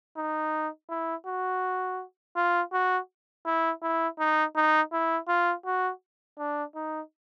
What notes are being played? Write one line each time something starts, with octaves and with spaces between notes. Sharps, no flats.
D#4
E4
F#4
F4
F#4
E4
E4
D#4
D#4
E4
F4
F#4
D4
D#4